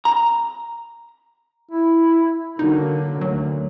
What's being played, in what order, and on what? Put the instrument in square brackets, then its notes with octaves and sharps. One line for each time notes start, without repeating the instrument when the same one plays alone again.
[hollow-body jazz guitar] A#5
[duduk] E4
[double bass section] D3 F#3 A#3 [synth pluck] D#4
[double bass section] D2 [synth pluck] F#3